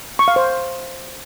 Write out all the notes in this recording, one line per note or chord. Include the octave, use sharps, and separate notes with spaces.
C#6
F5
C5